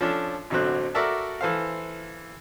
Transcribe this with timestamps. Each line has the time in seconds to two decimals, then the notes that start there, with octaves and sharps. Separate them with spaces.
0.01 F3 C#4 D4 A4
0.50 A1 B2 D3 F#3 C4 F#6
0.95 F#4 A4 A#4 D5 E5 A5
1.41 E3 A4 C5 F5